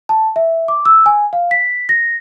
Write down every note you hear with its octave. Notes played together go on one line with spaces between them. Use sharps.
A5
E5
D6
E6
G#5
F5
B6
A#6